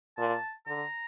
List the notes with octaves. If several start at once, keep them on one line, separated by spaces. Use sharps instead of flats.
A#2 A5
D3 A#5